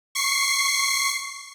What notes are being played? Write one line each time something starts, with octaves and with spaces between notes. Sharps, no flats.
C#6 C7